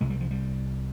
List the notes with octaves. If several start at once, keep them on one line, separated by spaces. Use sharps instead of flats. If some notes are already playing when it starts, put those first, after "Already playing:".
C2 C3 G#3
G3
F3
G3